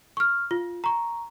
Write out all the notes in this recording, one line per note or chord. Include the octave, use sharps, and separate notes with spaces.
C#6 F6
F4
A#5 C#6